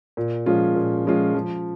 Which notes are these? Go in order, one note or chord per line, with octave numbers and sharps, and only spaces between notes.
A#2
F3 G#3 C#4 F4
A#2
F3 G#3 C#4 F4
F3